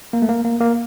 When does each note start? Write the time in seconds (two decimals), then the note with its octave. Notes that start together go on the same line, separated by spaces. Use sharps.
0.13 A#3
0.22 A3
0.29 A#3
0.45 A#3
0.60 A#3